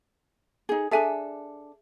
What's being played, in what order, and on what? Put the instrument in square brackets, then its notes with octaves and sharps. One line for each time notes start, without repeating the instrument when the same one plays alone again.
[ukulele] D#4 G#4
[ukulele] D4 A4 [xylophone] G#4 E5 G#5